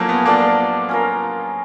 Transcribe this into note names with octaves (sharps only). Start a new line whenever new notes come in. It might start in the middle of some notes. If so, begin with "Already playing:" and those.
Already playing: F3 F#3 A3 A#3 C#4 E4
B3
A#3 D4 F4 A4 D5
C#4 F4 A#4